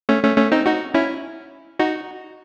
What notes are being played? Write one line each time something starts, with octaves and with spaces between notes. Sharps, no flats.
A3 C#4
A3 C#4
A3 C#4
C4 D#4
D#4 F#4
C#4 E4
D#4 F#4